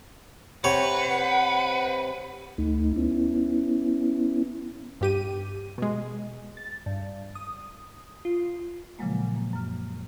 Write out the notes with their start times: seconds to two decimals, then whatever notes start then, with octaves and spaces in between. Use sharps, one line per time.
0.64 C3 B4 C#5 F#5
2.58 D2 A3 D#4
2.96 B3 C#4 E4
5.01 G2 G4 D#7
5.78 B2 G#3
6.57 A6
6.86 G2
7.35 D#6
8.25 F4
8.99 A#2 C#3 F3 F#3 G#3 A#3
9.36 A#3
9.53 F#2 F6